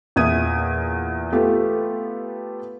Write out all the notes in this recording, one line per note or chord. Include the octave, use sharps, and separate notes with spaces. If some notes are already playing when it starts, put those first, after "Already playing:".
E2 A#2 E5 D#6 G#6 D#7
A3 B3 F4 G4 A4